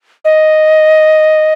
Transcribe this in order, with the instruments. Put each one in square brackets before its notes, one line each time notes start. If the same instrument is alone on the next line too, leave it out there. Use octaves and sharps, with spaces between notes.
[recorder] D#5